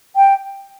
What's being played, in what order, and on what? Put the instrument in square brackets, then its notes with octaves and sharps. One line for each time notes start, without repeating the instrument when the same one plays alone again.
[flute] G5